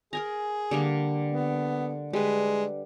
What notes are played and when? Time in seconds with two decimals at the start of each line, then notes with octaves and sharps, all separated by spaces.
0.13 G#4 A#4 G#5 A#5
0.71 D3 G3 A#3
1.32 B3
2.13 G3 G#3 B4